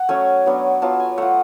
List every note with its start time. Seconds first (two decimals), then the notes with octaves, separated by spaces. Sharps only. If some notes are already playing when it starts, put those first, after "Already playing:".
Already playing: F#5
0.09 F#3 A3 C#4 G#5
0.46 F#3 B3 D4
0.82 F#3 B3 F4 A5
1.00 G#5
1.17 A3 F4 F#5